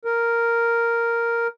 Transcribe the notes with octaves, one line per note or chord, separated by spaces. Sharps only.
A#4